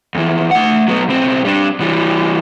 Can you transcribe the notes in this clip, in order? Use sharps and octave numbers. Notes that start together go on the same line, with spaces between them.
F2 E3
A3 F#5
F#3 B3
B1 C4
G3 D4
E3 G3